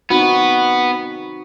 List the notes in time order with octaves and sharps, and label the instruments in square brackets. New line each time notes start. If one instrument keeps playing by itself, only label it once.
[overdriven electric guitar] B3 [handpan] C4 D#4 F#4